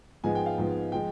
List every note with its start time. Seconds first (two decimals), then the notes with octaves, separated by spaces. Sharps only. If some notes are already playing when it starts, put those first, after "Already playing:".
0.24 G#2 F3 G#3 B3 G#5
0.35 G5
0.46 F5
0.58 G#2 F3 G#3 B3
0.92 F3 G#3 G5